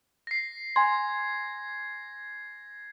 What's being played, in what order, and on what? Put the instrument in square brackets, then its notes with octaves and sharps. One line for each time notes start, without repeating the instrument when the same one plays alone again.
[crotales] A#6 C7
[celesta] G#5 C6 [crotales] G#6